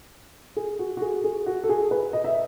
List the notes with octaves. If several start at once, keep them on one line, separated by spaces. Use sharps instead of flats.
G#4
F#4
F#4
G#4
G#4
F#4
A4
G#4
B4
D#5
E5